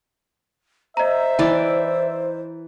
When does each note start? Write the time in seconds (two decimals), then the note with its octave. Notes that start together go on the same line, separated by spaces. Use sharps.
0.97 C5 D#5 E5 A#5
1.39 E3 D5